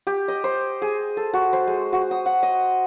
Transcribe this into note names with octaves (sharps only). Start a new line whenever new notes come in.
G4
D#5
C5
G#4
A4
F#4
C5
G#3
F#4
D#6
F#5
D#5